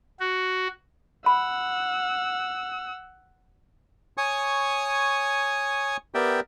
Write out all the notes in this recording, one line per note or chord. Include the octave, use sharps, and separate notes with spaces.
F#4
F#5 B5 E6
C#5 G#5 C#6 D#6
B3 G4 A#4 D5 E5 G5